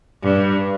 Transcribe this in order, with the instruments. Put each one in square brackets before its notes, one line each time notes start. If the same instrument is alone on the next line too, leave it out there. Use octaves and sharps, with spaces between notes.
[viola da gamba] G2